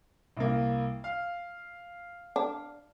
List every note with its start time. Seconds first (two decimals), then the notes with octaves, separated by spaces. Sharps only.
0.37 C2 A#3
1.04 F5
2.36 D4